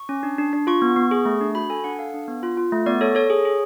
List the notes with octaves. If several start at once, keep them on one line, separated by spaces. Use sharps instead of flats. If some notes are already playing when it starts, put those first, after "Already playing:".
Already playing: C#6
C#4
D4
D4
D4
F4 C#6
B3
B3
G#4
A3
D4
F#4 B5
A4 G#5
D4 F#5
A4 F5
D4
B3
F4
F4
A3
B3 D5
A4 C#5
A4 C#5
G#4
G#4